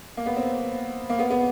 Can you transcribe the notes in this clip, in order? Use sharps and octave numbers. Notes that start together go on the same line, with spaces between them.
A#3
B3
C4
A#3
B3
B3